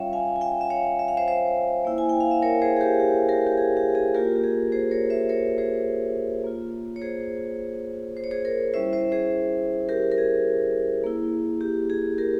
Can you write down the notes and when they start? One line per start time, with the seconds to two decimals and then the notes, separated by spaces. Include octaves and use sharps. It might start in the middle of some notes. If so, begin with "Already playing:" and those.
Already playing: G3 C#4 F4 C#5 E5 F5 G5
0.13 F5 G#5
0.36 G#5
0.41 E5 G5
0.61 E5
0.70 C#5 F5
0.99 E5
1.08 F5
1.17 C5 E5
1.28 C5 E5
1.85 A#3 E4
1.98 G#5
2.09 G5
2.20 F5
2.31 E5
2.42 A#4 C#5
2.62 G#4 C5
2.77 G#4
2.81 G4 A#4
3.00 G4
3.28 G4 A#4
3.47 G4
3.57 G#4
3.77 G4
3.95 G#4
4.15 A#3 F4 G4 A#4
4.36 G4
4.44 G#4
4.72 G#4 C5
4.91 A#4 C#5
5.10 C5 E5
5.29 A#4 C#5
5.58 G#4 C5
6.44 A#3 F4
6.96 C#5
7.02 G#4 C5
8.17 C5
8.24 C#5
8.31 G#4 C5
8.45 A#4 C#5
8.74 G3 C#4 E4 C5 E5
8.93 C5 E5
9.12 G#4 C5
9.89 G4 A#4
10.12 A#4
10.18 G#4
11.04 A#3 E4
11.61 G4
11.90 G#4
12.18 G4 A#4